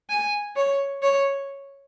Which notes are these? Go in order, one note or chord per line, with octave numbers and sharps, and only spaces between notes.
G#5
C#5
C#5